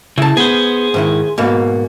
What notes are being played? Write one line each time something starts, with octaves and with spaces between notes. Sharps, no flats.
C#3 E4 A5
B3 G#4 C5
G#2 D#3 E4
G#2 B2 A#3